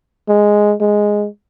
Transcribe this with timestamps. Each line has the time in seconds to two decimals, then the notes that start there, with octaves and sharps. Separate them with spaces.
0.29 G#3
0.81 G#3